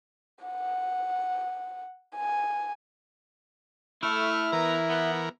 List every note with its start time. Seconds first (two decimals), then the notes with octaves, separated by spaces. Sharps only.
0.45 F#5
2.16 G#5
4.03 A3 E4 F6
4.53 E3 B3 A#4 A#5
4.89 B3